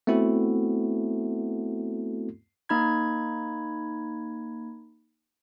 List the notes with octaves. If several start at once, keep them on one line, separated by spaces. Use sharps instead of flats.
A3 B3 C4 E4 F#4 A4
A#3 D#4 B5 G#6